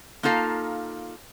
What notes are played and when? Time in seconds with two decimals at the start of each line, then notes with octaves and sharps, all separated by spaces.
0.23 A#3 D#4 F4 A4 F5